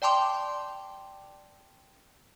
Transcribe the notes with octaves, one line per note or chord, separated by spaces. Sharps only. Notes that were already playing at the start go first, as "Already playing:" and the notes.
D5 G5 A5 C6 D6